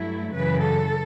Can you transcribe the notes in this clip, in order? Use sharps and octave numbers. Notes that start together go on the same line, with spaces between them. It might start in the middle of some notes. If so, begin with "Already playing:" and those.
Already playing: G2 F#3 A3 E4
F#2 C#3 E3 B4
A4